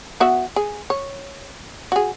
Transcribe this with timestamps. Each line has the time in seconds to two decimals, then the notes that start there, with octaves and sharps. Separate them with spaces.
0.20 B3 F#4 E5
0.56 G#4
0.90 C#5
1.92 F#4 G#4